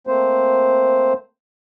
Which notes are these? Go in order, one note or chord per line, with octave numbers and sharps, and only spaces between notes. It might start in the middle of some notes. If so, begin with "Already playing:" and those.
A3 A#3 C4 C5